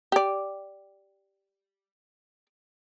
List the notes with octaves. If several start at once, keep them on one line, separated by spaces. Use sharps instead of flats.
G4 D5